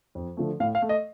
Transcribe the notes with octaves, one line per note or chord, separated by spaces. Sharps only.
F2
D3 F3 A3
A2 F5
F5
A3
D#5